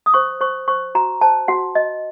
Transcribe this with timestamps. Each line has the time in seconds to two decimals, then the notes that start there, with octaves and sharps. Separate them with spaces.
0.06 D#6
0.14 C5 C#6
0.41 C5 C#6
0.68 C5 C#6
0.95 F#4 A#5
1.21 C5 A5
1.48 F#4 F#5
1.75 F#4 D#5